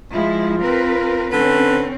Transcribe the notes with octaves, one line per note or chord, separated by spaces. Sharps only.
F3 G#3 E4 F4
C4 A#4 B4
D3 C4 C#4 B4